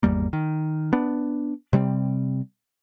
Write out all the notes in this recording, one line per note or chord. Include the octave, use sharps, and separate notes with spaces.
G#1 E2 G3 A#3
D#3
B3 D4
C3 G3 B3 C4